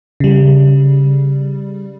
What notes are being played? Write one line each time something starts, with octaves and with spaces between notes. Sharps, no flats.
C#3 G3